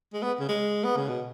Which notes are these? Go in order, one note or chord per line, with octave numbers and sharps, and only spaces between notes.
G#3
B3
C#3
G#3
B3
C#3
B2